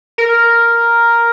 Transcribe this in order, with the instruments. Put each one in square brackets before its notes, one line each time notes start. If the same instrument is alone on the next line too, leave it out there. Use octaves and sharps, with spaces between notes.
[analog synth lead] A#4